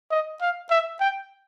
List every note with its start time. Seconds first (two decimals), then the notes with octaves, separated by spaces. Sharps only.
0.11 D#5
0.41 F5
0.71 E5
1.00 G5